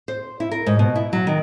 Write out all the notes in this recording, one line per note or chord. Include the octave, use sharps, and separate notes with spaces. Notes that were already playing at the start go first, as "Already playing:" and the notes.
C5
E4
A#4
G#2
B2
E4
F#3
D#3